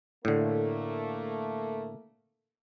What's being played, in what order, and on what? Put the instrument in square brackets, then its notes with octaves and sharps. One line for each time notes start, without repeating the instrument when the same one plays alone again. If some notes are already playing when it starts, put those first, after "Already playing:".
[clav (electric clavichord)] A2 D3 [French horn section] A3 A#3